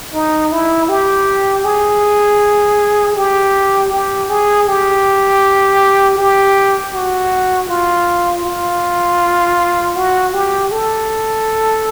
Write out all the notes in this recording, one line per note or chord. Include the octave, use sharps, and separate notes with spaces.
D#4
E4
G4
G#4
G4
G4
G#4
G4
G4
F#4
F4
F4
F#4
G4
A4